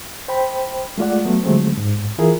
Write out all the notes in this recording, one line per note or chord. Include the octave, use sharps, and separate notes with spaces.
C5 G5 B5
G#3 A3 F4 D5 F#5
F#3 A3 B3
D3 F3 F#3 G#3 A3 C4
G#2
E3 E4 F4 G#4 A#4